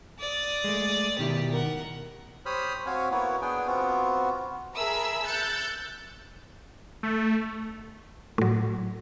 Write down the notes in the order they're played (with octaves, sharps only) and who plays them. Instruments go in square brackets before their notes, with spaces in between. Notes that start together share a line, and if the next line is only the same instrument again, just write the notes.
[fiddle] D5 D#6
[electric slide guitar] G#3 A3
[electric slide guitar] B2 D#3 E4 [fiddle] G4
[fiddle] A#4 F#5
[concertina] G4 C5 C#5 B5 D#6 F6
C4 F#4 C#5 F5 G#5
A#3 B3 E4 F#4 C#5
B3 D4 G#4 G5 G#5
B3 C4 F4 F#4
[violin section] G#4 A#4 E5 A5 B5 E6
E6 F#6 G6 A6 C#7
[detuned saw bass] A3
[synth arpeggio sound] A2 F#3